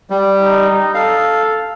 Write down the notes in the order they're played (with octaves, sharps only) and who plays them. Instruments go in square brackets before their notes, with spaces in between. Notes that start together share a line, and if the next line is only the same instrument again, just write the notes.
[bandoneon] G3
[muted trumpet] D#4
[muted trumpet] A4 [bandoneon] F5